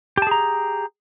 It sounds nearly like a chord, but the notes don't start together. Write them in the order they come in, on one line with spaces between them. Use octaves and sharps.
G4 A5 G#4 A#5